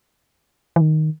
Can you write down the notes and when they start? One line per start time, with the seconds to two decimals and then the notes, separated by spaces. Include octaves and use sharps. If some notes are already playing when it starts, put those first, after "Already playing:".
0.76 E3
0.81 D#3